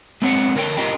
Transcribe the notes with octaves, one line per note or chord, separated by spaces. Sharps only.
G#3 B3 C4 D4 C#5 F#5
D3 A#4 C#5 G5
D4 F4 G4 A#4 D#5 G5